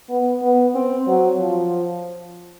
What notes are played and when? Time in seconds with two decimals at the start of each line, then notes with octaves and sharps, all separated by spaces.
0.09 B3
0.42 B3
0.75 C4
1.07 F#3
1.40 F3